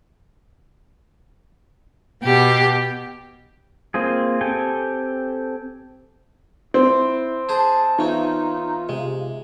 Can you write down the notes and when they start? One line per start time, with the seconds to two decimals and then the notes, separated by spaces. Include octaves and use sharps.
2.23 B2 G4
3.94 A#3 C4 F4 G#4
4.41 C4 G4 A4 G5 G#5
6.74 C4 E4
7.49 G#4 C5 A5
7.99 E2 C#4 D#4 F4
8.89 C3 G#3